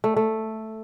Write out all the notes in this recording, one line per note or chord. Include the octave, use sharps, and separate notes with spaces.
A3
A3